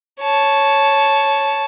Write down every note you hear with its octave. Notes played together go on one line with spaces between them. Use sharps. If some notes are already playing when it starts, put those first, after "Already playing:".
C#5 A5